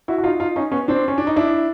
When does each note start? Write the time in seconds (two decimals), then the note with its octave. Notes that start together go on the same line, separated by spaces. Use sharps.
0.08 E4 F#4
0.18 F#4
0.24 D#4 F4
0.40 D#4 F4
0.56 C#4 D#4
0.72 B3 C#4
0.88 C4 D4
1.08 C#4
1.18 D4
1.27 D#4
1.36 D4 E4